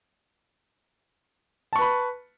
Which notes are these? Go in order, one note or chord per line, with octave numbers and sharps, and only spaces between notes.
B4 A5 B5 C#6